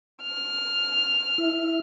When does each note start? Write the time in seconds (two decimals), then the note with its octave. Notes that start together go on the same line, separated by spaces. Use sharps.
0.23 F6
1.38 E4